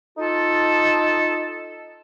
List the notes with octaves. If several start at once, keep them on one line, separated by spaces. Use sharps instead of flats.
D#4 F4 A4